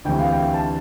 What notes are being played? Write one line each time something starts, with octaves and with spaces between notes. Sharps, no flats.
D2 C3 E3 G5
F5
G5
A5